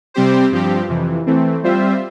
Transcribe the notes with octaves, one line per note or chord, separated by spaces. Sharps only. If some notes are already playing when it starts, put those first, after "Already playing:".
C3 G3 C4 G4 C5
G2 F3 C4 G4
F2 C3 E3
E3 A3 C4
G3 C4 F4 C5 E5